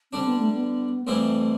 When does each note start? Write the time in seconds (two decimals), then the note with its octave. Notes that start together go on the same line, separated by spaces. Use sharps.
0.12 D3 G3 C4 D4
0.25 B3
0.39 A3
0.53 B3
1.06 F2 E3 G3 A3 C4 E4